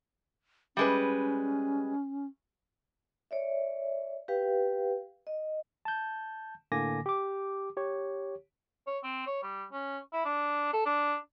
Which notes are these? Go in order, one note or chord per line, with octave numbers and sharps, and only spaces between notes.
G3 G#3 C#4 B4
C#5 D5 E5
G4 B4 F5 G5
D#5
A5 G6
A2 D3 A#3 G#5 D6 A#6
G4 D6
G4 C#5
C#5
C4
C#5
G3
C#4
E4
D4
A4
D4